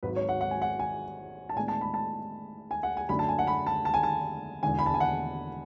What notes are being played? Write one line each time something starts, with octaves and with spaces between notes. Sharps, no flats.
G#1 G#2 F#3 B4
C#5
F#5
F#5
G#5
F#5
G#5
A5
A2 G#3 B3 D4 G#5
A5
B5
A5
G#5
F#5
G#5
F#2 D3 A3 D4 B5
A5
G#5
F#5
B5
A5
A5
G#5
A5
E1 E2 D3 G#5
B5
A5
G#5
F#5